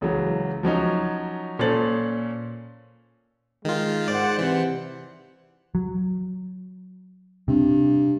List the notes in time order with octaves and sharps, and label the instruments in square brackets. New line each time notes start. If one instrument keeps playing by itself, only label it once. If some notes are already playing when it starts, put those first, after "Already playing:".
[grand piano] C#2 C#3 E3 F#3
F3 F#3 C#4 D#4
A#2 C#4 A4 C5 A6 F#7
[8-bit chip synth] D#3 F4 [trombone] G#3
[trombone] G#2 [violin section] C5 F#5 [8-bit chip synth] D5
[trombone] C3 [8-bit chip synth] E3
[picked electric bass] F#3
[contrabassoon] G2 [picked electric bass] C3